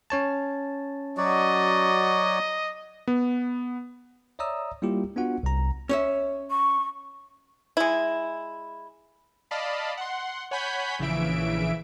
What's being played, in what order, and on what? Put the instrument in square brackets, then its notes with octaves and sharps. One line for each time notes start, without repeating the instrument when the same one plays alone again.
[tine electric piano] C#4 C#5 A5
[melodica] F#3 F#4 D5 [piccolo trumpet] D#5
[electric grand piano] B3
[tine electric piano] C#5 D5 E5 A#5 D#6 E6
G3 A#3 E4 F4 G4
B3 D4 F4 F#4 F#5
C2 A#5
[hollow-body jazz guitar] C#4 C#5 E5
[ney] C#6
[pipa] G#3 E4
[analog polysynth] D5 D#5 F5 A5 B5
F#5 C6
C#5 F#5 G#5 B5 G6 B6
A#1 C#3 E3 E5 D7